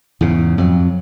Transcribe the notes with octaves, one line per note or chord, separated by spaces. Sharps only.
E2 G#2 C#3
F2 F#3